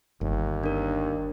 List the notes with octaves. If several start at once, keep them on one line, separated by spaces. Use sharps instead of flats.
G1 D#2
D4 A#4